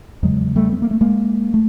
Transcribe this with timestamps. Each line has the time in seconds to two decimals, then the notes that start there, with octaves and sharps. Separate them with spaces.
0.23 E2 C#3 F#3 G#3
0.56 G3 A3
0.72 B3
0.82 A#3
0.91 A3
1.01 G#3 A#3
1.54 A3